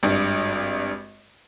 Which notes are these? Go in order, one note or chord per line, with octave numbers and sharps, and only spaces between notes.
G#1 G2